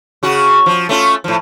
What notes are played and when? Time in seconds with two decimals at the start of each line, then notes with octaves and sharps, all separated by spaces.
0.23 C#3 F#4
0.66 F3
0.89 A3 C#4 F4
1.24 A2 F3